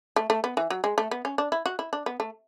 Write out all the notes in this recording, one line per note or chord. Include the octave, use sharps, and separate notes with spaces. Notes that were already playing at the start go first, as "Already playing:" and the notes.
A3
A3
B3
E3
F#3
G#3
A3
B3
C#4
D4
E4
F#4
E4
D4
B3
A3